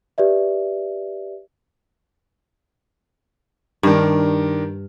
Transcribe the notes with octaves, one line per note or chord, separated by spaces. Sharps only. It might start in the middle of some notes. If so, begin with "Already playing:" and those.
G4 B4 D5 E5
G2 D#3 D4 A#4